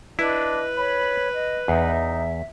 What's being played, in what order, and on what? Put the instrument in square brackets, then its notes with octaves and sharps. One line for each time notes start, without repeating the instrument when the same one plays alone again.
[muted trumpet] D4 [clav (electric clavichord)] E4 [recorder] B4 [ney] D#5
[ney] C#5 [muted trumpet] B5
[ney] D#5
[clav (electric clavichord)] E2 [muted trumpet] D#4 [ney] E5